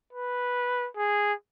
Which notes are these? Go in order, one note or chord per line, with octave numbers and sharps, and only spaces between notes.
B4
G#4